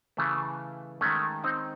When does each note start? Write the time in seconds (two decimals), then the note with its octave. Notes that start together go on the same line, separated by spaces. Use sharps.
0.17 C#3 E3 A3
1.01 D#3 G#3 A3 C#4
1.44 C4 D#4